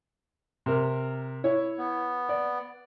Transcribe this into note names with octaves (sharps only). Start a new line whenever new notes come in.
C3 A#4
E4 C#5
B3
D5